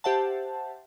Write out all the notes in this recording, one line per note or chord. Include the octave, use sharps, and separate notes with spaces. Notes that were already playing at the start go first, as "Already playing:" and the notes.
G4 C5 E5 F#5 A5